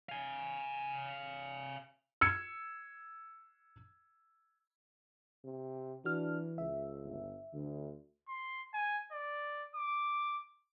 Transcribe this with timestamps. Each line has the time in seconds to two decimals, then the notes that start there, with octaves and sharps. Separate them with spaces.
0.09 F5 G#5
2.21 E6 G#6 C#7
5.45 C3
6.05 E3 D4 F#4 F6
6.58 C#2 E5
7.04 G1
7.54 D2 D3
8.29 C6
8.74 G#5
9.12 D5
9.75 D6